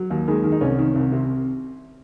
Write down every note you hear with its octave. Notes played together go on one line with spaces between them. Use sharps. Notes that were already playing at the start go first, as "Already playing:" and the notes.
Already playing: F#3
D#2
D#3 G#3
D#3
D#4
C2 C#4
D#3
C2
C3